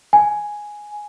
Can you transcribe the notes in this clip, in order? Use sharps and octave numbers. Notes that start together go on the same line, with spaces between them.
G#5